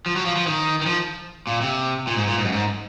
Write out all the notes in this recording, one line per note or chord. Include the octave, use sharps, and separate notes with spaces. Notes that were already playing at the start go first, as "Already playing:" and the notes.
F3
F#3
F3
F3
D#3
D#3
F3
A#2
C3
A#2
G#2
A#2
G#2
F#2
G#2